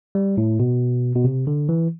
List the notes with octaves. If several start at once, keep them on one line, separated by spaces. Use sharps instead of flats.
G3
A2
B2
B2
C3
D3
E3